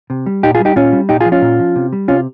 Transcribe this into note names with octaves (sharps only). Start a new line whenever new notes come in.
C3
G3
A#2 D#4 G4
F4 G#4
G3
D#4 G4
A#2 C#4 F4
G3
A#2 D#4 G4
F4 G#4
F3
C#4 F4
A#2
F3
C3
G3
C3 C#4 F4